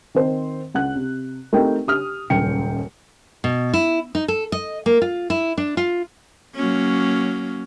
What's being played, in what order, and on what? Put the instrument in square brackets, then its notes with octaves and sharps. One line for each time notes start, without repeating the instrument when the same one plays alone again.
[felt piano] D#3 C4 C5
C#2 F#5 F#6
C3
A3 C4 D#4 G4 A#4 G5
G4 D#6 F6
D#1 C#2 F#2 G5 C#7
[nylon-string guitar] B2
E4
D#4
A4
D#5
A#3
F4
E4
D4
F4
[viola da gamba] F#3 A#3 C#4